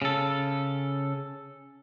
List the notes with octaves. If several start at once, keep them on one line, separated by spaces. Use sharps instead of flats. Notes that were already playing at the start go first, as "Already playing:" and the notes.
C#3 A4